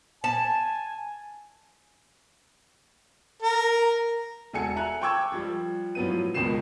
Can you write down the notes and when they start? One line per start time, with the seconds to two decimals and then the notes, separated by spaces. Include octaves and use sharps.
0.24 G#5 A5
3.42 A#4
4.53 E1 F#4 A4 G#5 C#7
4.76 E5 G#5 A#5 F#6
5.02 G5 A5 C#6 D6 E6 G#6
5.32 F3 G3
5.95 A2 F3 F#3 B3 D#7
6.34 C#2 B2 D#3 F3 C7 E7